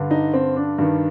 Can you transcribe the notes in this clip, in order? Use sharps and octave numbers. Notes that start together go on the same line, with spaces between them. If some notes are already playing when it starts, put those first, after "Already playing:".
Already playing: G2 D3
D#4
C4
D4
G2 D#3